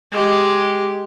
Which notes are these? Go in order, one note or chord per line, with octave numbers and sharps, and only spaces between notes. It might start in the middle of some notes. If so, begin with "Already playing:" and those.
G#3 G4